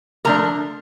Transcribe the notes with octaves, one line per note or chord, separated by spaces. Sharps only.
D3 F3 A3 D4 A#4 A#5